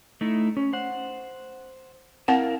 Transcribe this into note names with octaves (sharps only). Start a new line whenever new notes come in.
A3 D#4 E4
C#4
C5 F#5
C4 E4 A#4 F5 F#5